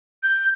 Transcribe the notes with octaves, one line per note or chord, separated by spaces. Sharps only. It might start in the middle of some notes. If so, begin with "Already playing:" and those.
G6